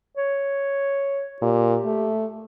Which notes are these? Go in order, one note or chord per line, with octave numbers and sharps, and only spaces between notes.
C#5
A#2 G4
A3